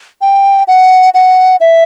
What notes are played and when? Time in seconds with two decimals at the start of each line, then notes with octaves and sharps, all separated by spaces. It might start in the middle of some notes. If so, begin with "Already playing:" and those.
0.21 G5
0.68 F#5
1.14 F#5
1.60 E5